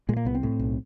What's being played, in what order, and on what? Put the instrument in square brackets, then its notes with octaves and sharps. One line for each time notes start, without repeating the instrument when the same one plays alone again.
[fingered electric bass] A#2 G#3
A#3
C2 B3
C4
A2
B1